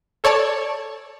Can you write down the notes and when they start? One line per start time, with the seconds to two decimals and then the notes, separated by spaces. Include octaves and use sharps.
0.24 A4 C#5 D5 A5